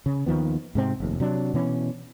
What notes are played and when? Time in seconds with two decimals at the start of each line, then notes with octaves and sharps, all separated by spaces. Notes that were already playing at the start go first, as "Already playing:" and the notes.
0.06 C#3
0.26 D#2 D#3 F3 B3
0.75 G#2 C3 C4
1.00 F1 D#2
1.20 C3 F#3 D4
1.54 B2 E3 C#4